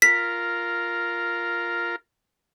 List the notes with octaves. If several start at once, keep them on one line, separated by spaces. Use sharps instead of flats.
F4 A#4 B6